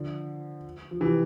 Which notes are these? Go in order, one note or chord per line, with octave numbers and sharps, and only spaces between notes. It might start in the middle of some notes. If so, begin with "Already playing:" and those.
Already playing: D3 F3
F3
C3 E3